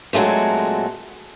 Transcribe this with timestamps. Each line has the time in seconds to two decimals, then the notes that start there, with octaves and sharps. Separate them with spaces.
0.13 A#2 F#3 G#3 A3 C4